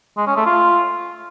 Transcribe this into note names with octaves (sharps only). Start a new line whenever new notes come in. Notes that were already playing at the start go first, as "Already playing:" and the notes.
G#3
C#4
A3
F4